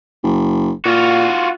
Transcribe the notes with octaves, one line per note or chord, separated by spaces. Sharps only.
F#1
A#2 F4 F#4